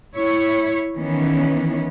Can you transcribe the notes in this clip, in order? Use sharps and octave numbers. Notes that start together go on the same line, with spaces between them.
E4 C#5
D#3 E3 B3 C#4